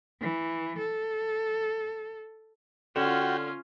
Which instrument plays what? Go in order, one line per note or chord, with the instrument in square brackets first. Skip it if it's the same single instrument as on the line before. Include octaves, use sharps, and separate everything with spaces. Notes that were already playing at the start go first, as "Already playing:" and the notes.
[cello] E3
A4
[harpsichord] D3 [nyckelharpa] C#4 F4 [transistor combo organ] F#4 G5